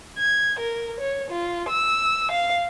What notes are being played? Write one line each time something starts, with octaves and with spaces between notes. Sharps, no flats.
G#6
A#4
C#5
F4
E6
F5